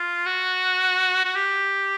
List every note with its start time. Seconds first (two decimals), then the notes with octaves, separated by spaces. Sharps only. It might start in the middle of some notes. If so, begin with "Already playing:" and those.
Already playing: F4
0.26 F#4
1.25 F#4
1.35 G4